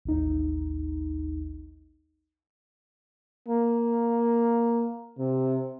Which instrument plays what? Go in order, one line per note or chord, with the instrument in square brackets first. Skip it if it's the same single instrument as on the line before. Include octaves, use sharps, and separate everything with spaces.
[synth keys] A1 D#2 D#4
[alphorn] A#3
C3